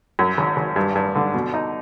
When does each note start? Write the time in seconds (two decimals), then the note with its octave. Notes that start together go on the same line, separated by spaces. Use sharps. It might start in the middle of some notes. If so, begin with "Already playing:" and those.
0.19 F#2
0.38 G#1
0.57 G#1
0.76 G2
0.95 G2
1.15 D3
1.34 B2
1.54 D#4